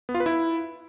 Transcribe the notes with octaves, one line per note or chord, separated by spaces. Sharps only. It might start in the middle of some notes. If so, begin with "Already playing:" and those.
B3
F4
B4
E4